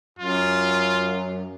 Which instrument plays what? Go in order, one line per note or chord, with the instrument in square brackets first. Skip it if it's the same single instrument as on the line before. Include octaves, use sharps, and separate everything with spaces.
[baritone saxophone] F#2 [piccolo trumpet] F4